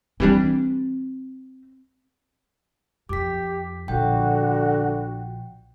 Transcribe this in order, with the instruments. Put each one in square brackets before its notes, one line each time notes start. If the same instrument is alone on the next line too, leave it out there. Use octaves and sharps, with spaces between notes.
[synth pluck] E3 G3 D4 [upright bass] C4
[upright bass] F2 [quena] G4 [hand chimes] D6 B6
[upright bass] A#1 [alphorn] D3 [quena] F#4 [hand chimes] G5